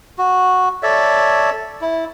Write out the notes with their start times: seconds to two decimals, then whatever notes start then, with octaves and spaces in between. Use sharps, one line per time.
0.18 F#4
0.83 A4 C#5 D5 E5
1.81 E4